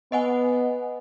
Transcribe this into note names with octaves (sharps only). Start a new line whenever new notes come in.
B3 D#5 F#5 G#5